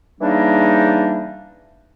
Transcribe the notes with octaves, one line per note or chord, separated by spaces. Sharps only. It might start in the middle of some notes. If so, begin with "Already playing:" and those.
C#3 E3 G3 A#3 D4 D#4